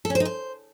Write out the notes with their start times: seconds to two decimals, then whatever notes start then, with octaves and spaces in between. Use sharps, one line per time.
0.05 A4
0.10 C#4
0.15 C5
0.20 D#4
0.25 C5